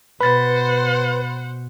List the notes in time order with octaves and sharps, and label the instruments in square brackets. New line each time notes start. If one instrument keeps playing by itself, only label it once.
[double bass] B2 [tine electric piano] B4 [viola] C5 F#5 [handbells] B5 A6